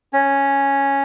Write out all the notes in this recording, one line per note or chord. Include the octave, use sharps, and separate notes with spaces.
C#4